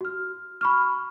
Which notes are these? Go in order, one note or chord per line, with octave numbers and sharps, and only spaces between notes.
F#4 F6
B5 C#6 F6